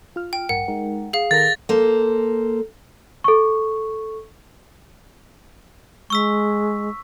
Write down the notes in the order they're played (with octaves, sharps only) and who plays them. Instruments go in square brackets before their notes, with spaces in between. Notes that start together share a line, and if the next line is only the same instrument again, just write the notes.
[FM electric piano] F4 F6
[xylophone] G5
[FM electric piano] A1 G2 A#4 [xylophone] F#5
[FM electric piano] G#3 D#4 A#4
[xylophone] G#4 F5
[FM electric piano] D#3 A4 A#4 [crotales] A6 A#6
[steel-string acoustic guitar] A#3 A4 C5
[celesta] A4 C#6
[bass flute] G#3 [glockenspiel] C#6 E6 B6